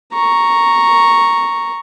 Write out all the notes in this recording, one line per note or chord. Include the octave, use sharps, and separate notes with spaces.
A#5 C#6